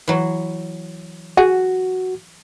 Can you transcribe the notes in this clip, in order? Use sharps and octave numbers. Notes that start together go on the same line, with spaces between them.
E3 F#3
F#4 G#4 F#5